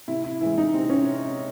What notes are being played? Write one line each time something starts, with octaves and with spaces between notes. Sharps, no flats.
C3 E4
E4
E3 G#3 E4
D#4
C3 C4
C#4